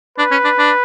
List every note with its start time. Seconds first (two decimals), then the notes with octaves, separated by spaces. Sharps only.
0.18 D4 B4
0.31 C#4
0.44 D4
0.58 D4